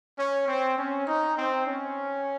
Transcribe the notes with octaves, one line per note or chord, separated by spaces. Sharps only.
C#4
C4
C#4
D#4
C4
C#4